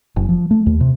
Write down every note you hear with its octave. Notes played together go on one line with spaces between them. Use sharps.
F#1
F3
A3
D#2
C3